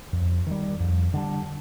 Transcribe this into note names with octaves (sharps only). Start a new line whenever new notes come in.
F2
D#3 G3
F2
D3 G3 D4